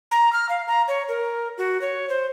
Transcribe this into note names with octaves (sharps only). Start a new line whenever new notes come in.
A#5
F6
F5
A#5
C#5
A#4
F#4
C#5
C5